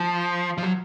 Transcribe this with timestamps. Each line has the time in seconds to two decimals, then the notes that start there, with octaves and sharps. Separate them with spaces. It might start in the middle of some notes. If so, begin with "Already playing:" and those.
Already playing: F3
0.58 F3
0.63 F#3